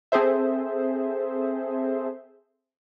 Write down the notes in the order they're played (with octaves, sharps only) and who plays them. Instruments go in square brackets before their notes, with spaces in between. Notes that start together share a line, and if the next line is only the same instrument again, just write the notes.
[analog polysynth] C4 G#4 A4 C5 E5